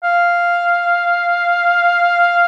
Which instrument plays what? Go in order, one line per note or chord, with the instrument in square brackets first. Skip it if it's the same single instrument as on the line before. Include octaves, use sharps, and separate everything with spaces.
[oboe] F5